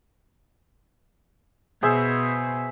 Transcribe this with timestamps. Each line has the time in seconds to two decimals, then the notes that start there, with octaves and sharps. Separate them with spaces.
1.83 B2 G#4 C5 E5